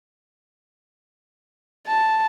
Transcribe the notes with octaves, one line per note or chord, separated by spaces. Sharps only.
A5